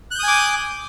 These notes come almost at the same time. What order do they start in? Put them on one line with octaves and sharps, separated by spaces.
F#6 G6 D#6 G#5 D6